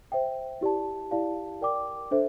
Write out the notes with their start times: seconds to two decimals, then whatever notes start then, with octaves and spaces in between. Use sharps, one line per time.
0.12 C5 E5 G5
0.61 E4 G4 D5 A5
1.11 E4 G4 D5 F5 A5
1.61 A#4 D5 G5 D6
2.11 D4 A4 C5 E5